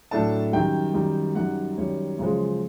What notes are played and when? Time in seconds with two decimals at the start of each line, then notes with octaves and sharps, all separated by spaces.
0.11 A2 F#3 A3 D4 A5
0.52 F#2 D#3 G3 G5
0.94 F#2 D#3 G3
1.35 F#2 D#3 G3 F#5
1.78 F#2 D#3 G3 C#5
2.18 F#2 C#3 F3 G#3